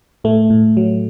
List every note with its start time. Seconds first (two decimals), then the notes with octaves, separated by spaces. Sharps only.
0.24 A2 A3
0.50 A2
0.77 F#3